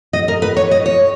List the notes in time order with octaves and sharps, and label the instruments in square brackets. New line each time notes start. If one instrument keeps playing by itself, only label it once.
[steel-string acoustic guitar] D#5
A#4
B4
C#5
D#5
C#5